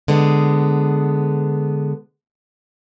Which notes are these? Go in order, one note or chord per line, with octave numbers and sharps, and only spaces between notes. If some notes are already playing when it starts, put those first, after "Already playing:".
D3 G#3 B3